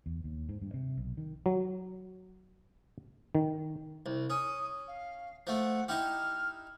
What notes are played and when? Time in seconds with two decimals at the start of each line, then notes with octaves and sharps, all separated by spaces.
0.06 E2
0.24 D#2
0.49 G#2
0.62 G2
0.74 C3
0.97 B1
1.17 D#3
1.46 F#3
3.35 D#3
4.06 C2
4.30 C#4 D#6
4.88 F5
5.47 F3 A3 F#5
5.88 D#4 E4 G4 F6